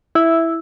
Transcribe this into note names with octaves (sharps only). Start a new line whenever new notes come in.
E4